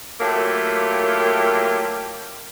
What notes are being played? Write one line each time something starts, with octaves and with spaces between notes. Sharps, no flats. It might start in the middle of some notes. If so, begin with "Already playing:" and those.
F#3 A3 A#3 E4 F4 G4